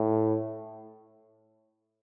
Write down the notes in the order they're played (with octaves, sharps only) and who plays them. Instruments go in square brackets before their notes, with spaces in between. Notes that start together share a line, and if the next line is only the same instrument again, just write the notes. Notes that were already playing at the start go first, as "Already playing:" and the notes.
Already playing: [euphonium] A2